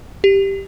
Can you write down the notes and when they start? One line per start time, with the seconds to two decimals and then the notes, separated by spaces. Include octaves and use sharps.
0.24 G4